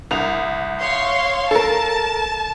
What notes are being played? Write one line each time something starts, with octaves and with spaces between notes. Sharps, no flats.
C2 F7
C#5 F5 C6
A4 A#4 A5